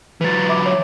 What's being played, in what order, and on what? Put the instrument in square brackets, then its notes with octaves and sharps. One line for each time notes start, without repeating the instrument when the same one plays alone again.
[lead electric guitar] E3 F#3 [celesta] B4 A6
[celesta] E5 B5 D6
C#5